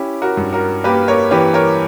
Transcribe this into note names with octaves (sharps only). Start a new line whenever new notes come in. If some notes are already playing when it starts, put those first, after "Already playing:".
Already playing: C#4 E4 G4
F#4 A#4
G2
F#4 A#4
A#3 G4 B4
A#4 C#5
E3 G4 B4
A#4 C#5